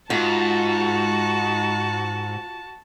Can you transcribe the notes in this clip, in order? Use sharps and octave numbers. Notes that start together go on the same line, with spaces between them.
G#2 F4 F#4 A5